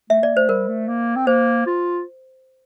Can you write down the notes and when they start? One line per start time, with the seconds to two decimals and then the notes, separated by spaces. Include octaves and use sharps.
0.10 A3 E5
0.22 A#3 D5
0.35 A3 C5
0.49 G3 A#4
0.68 A3
0.88 A#3
1.16 C4
1.27 A#3 C5
1.67 F4